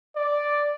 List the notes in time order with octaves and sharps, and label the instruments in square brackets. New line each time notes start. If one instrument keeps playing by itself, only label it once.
[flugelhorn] D5